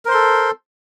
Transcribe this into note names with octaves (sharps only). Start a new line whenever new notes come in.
A4 A#4 C5 C6